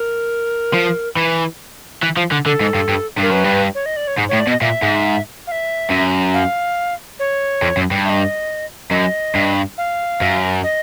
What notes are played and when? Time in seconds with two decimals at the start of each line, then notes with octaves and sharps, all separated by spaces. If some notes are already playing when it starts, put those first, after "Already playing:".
Already playing: A#4
0.74 F3
1.17 E3
2.02 E3
2.17 F3
2.32 D3
2.46 D3 A4
2.60 G#2
2.74 G2
2.89 G2
3.18 G2 A#4
3.31 F#2 B4
3.44 G2
3.75 C#5
3.86 D#5
3.97 D5
4.08 C#5
4.18 G#2
4.29 C#5
4.33 A2
4.40 D5
4.47 B2
4.50 D#5
4.61 A#2 E5
4.82 G#2
5.47 F5
5.52 E5
5.90 F#2
6.34 F5
7.19 C#5
7.62 F2
7.77 F#2
7.91 G2
8.05 E5
8.10 D#5
8.91 F#2 D#5
9.35 G2
9.78 F5
10.22 F#2
10.64 D#5